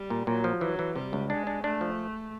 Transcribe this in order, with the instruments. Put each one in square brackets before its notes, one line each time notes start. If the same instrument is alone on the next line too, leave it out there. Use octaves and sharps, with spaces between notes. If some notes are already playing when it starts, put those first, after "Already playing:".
Already playing: [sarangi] G3
[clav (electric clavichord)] A#2
[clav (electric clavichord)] A#2 [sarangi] F#3
[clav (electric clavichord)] F3
[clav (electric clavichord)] E3 [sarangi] F#3
[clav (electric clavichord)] E3
[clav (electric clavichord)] C3 [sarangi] G3
[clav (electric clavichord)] C#2
[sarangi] G#3 [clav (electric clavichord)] D4
[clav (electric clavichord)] D4
[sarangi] A3 [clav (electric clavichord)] D4
[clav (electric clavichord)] F3